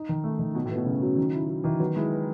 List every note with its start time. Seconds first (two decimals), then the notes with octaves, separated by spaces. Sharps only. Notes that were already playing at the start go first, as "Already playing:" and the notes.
Already playing: D#4
0.09 D#3
0.24 A3
0.39 D#3
0.55 B2 F#3
0.66 A2
0.70 B3
0.76 B2
0.86 C#3
1.02 F#3
1.17 D#3
1.33 E4
1.48 F#3
1.64 D#3 E3
1.79 F#3 B3
1.96 G#3 E4
2.12 B3